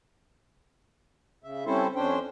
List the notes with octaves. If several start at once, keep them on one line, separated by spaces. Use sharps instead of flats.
C#3 E5
G3 C4 C#4 E4 A4 C5
F2 C#4 D4 C5 G5